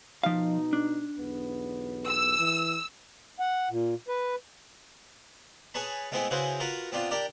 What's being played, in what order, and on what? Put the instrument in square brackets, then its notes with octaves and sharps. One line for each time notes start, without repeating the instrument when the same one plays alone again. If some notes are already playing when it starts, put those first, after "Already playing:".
[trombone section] B2 D#4 [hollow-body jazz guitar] F3 F5
[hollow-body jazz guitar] D4
[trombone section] B1 E2 B3
[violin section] E6
[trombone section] E3
[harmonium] F#5
A#2
B4
[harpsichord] G#4 B4 C#5 A5 B5
G#3 A3 B3 C4 E4 G#4
C#3 E4 F#4 G#4 B4 C5
F4 F#4 A#4 B4
B3 C4 D4 F4
D4 G4 A#4 D5